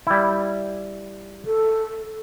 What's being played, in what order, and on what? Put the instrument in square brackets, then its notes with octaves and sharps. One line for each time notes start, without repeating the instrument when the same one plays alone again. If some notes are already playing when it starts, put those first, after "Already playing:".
[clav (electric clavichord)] G3 E4
[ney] A4